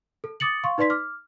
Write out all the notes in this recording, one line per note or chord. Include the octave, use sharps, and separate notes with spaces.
A4
D6 D#6 A6 C#7 F#7
F5 C6 C#6
D#4 B4 D5 C6 B6
D6 F6